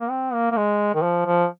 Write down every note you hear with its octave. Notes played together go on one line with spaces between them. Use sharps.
A#3
C4
A#3
A#3
G#3
D#3
F3
F3